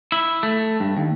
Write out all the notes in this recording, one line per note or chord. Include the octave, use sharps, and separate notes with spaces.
E4
A3
G2
D#2